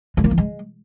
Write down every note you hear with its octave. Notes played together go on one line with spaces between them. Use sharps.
G#3
A#3
E3
G#3